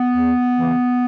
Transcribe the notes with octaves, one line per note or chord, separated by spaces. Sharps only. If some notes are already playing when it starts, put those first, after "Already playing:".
Already playing: B3
E2
C#3 E3